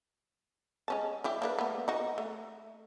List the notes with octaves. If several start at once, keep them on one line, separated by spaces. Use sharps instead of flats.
G#3 C#4 A5
G3 E4 G4
A#3 D4 B4
A3 B3
D#4 F#4
A3